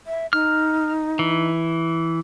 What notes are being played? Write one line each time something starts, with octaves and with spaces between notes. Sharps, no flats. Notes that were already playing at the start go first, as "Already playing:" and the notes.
E5
D#4 F6
E3